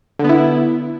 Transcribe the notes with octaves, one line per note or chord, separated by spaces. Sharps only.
D3 B3 E4